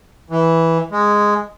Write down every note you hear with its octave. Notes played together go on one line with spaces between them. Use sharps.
E3
G#3